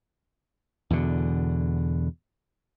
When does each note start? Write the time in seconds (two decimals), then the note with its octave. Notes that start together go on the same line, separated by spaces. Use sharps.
0.90 E2 B2 D3